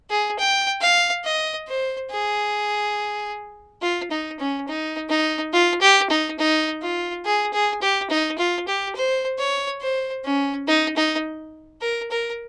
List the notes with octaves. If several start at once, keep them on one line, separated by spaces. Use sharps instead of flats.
G#4
G5
F5
D#5
C5
G#4
F4
D#4
C#4
D#4
D#4
F4
G4
D#4
D#4
F4
G#4
G#4
G4
D#4
F4
G4
C5
C#5
C5
C#4
D#4
D#4
A#4
A#4